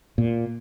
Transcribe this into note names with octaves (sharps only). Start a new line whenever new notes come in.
A#2